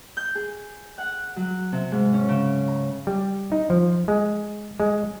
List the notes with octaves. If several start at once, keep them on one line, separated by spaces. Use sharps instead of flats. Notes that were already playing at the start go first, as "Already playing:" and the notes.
G6
G#4
F#5
F#3
C3
G#2
C#4
C#3
A#5
G3
D#4
F3
G#3
G#3